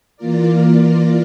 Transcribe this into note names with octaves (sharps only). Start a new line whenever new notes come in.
E3 A#3 F4 A#4 D5